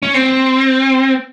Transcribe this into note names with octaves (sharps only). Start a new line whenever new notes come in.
C#4
C4